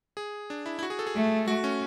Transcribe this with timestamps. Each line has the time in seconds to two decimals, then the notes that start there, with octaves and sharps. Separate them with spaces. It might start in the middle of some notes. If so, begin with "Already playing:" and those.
0.17 G#4
0.50 D4
0.66 E4
0.79 E4
0.83 F#4
0.90 G#4
0.99 A4
1.07 G#4
1.16 A3
1.48 A3 F#4
1.64 C#4